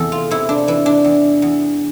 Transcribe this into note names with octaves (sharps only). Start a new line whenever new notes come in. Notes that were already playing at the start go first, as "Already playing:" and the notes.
Already playing: E2 C3 A4
F4
C3 E4
D4
E3 E4
D4
E2
E2